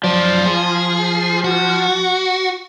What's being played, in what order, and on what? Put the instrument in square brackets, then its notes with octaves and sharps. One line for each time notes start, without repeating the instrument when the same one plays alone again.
[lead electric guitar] F#2 D5 [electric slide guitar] F3
[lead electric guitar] G#4
F#4